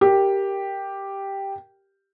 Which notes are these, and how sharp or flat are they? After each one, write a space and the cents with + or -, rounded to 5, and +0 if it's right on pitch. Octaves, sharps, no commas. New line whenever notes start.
G4 +0 A#4 +0